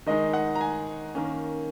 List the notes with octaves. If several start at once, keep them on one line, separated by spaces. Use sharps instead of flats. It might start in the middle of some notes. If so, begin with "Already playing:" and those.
D#3 G#3 D#4 D#5
F#5
A#5
G#5
D#3 A#3 C#4